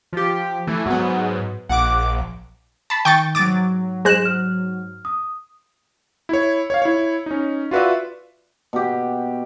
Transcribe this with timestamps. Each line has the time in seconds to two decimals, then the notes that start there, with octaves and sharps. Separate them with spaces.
0.13 F3 G4
0.67 E3 A3
0.86 G#2 F#3 B3
1.69 A#1 F#5 D6
2.90 A5 B5
3.05 D#3 G5 C#6 A6
3.35 G#2 F#3 D6 A6 D7
4.05 G#3 C5 F#6 A#6 E7
4.25 F6
5.05 D#6
6.29 E4 C#5
6.70 C#5 F5
6.82 E4 C#5
7.26 C#4 D#4
7.71 F4 F#4 B4 D5 E5
8.73 B2 G4